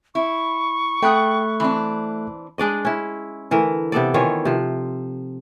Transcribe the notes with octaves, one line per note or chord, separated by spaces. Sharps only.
E4 C#6
A3 G#4 F#5 G5 B5 F#6
E3 C4 D4
G#3 D4 D5 D#5
C#4 E4
D3 E3 A3 A#4
C3 B3 A4 D5
D#3 E3 F4 C#5
C3 F3